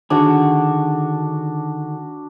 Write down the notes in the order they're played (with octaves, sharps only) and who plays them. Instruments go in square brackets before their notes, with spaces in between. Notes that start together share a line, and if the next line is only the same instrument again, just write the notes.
[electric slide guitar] D3 D#3 G#4 [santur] D4 F#4